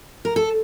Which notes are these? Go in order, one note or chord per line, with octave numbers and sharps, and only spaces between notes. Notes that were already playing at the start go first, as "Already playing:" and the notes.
A#4
A4